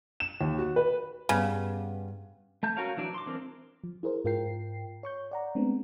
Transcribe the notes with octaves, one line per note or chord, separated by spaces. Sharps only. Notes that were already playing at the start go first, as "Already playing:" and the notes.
E7
D#2
F#4
B4
G2 C#3 B3 F#5
A3 A5 G6
C#4 F#4 A#4 C#5 F5
E3 F#3 D4 D5
C6 D6
E3 G#3 C4 D4 A#4
F3
E4 G#4 A#4 C5
G#2 F4 A#4 G5 C7
C#5 C#6 G6
D5 F#5 A#5
G#3 A3 B3 C4 D4